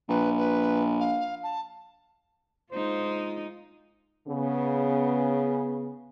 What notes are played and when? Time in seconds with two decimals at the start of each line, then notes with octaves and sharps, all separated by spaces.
0.09 A#1 B4
0.37 B4
1.00 F5
1.43 A5
2.72 G#3 D#4 F4 C5
4.28 C#3 B3